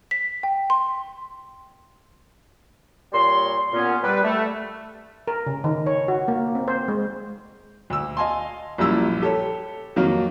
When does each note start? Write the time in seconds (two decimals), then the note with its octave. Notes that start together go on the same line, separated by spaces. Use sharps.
0.11 B6
0.43 G5
0.70 C6
3.12 A#2 G3 C#5 C6
3.73 A#2 B3 C#4
4.03 G3 B4
4.23 A3
5.28 A#4
5.46 C#3
5.64 D#3
5.86 C#5
6.08 F#4
6.28 A#3
6.55 C4
6.68 C5
6.88 G#3
7.90 D2 E6
8.17 D#5 F5 G#5 A5 C6
8.78 A#1 F#2 G3 A#3 E4 E6
9.21 G4 A4 C#5
9.96 F2 D#3 F#3 A#3